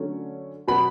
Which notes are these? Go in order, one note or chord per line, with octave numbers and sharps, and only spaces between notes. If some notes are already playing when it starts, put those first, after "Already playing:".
Already playing: D3 F#3 A3 C#4
B2 F#3 B3 B5